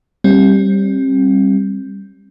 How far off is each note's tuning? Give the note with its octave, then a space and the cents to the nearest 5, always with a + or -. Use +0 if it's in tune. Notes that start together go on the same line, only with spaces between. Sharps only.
G3 +0 C4 +40